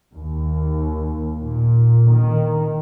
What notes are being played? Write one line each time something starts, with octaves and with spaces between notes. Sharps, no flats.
D#2
A#2
D#3